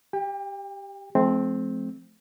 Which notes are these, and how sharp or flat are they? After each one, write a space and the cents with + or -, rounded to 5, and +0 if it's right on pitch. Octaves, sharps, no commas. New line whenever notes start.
G4 +0 G5 +35
F3 +0 A3 -45 C4 +0